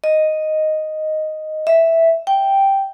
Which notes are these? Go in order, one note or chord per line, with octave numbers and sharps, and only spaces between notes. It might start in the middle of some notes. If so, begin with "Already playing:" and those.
D#5
E5
G5